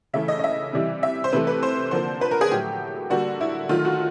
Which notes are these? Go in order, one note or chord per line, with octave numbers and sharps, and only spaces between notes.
C#3 E3 A3 E5
D#5
D#5
E5
C3 E3 G3
E5
C5
C3 E3 A3 B4
B4
C5
D3 F3 A#3 C5
B4
A#4
G#4
A2 F#3 A3 G4
D3 G3 A#3 F#4
E4
D#3 F#3 A3 F4
F#4